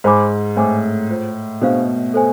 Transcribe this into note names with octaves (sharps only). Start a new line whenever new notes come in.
G#2 C5 G#5 B5 D6
A2 C5 G#5 D6
F4 G#4 C5
B2 D4 G#4 C5 F5
A4 C5 G#5